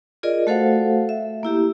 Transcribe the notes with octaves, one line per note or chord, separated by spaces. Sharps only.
F4 G#4 A#4 D5 D#5
A3 F#4 A4 C5 F5 F#5
E5
A#3 E4 G4